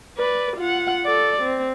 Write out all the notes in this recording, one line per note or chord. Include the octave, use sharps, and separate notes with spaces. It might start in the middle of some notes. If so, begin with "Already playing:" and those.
B4 D5
F4 F#5
A4 D5
C4